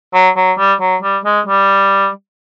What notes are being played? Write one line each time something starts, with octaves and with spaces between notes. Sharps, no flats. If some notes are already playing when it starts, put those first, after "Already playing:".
F#3
F#3
G3
F#3
G3
G#3
G3